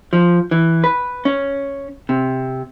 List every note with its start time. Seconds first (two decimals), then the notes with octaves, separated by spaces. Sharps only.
0.13 F3
0.51 E3
0.84 B4
1.25 C#4
2.09 C3